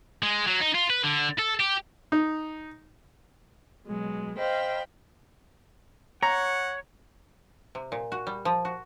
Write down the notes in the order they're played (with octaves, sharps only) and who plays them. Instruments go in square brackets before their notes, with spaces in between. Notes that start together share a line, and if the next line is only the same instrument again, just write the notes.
[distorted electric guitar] G#3
F#3
D#4
F4
B4
D3
A4
G4
[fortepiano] D#4
[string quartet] B2 F#3 G#3
C5 D#5 F5 G5 B5
[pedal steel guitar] C#5 [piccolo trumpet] F#5 [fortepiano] A#5
[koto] C3
A#2
F#4
G3
F3
F#4